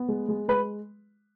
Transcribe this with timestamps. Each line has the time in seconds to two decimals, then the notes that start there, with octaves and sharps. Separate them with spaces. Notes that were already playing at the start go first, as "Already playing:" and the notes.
Already playing: B3
0.08 G#3
0.28 G#3
0.48 G#3 B4